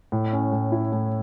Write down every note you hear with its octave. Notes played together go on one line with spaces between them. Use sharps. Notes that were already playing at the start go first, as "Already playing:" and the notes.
A2
C#4
A2
E4
A2